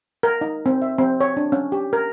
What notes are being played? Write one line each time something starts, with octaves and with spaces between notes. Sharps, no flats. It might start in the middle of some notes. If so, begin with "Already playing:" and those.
A#4
D#4
C4
E5
C4
C#5
D4
C#4
G4
A#4